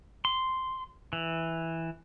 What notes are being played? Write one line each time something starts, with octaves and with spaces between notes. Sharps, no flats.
C6
E3